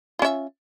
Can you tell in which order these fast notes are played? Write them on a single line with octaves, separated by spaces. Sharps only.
F4 C#4 E5